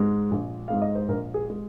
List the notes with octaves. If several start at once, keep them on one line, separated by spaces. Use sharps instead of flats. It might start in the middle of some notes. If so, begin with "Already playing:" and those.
Already playing: G#2 G#3
A#1
G#2 G#3 F5
D#5
C5
A#1 A#4
G#4
G#3